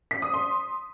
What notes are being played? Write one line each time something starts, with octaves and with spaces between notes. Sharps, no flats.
B6
D#6
C6